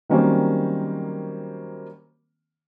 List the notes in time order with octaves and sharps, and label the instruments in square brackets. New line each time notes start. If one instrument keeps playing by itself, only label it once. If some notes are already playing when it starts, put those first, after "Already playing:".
[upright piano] D#3 F#3 G3 A#3 C4 C#4